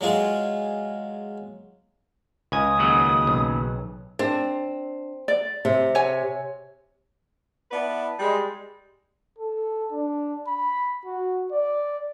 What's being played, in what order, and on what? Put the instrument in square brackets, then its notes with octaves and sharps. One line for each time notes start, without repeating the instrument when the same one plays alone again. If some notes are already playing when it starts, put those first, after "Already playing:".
[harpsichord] F#3 G#3 F4 G#4
[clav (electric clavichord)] C#2 G#5 [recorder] D#6
[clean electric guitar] D#2 C#3 F#3
[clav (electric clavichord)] B1
[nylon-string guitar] C4 [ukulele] D4
[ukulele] D5
[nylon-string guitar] C3
[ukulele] C#5 G#5
[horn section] B3 E4 B4 D5 A5
G3 G#3
[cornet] A4
D4
B5
F#4
D5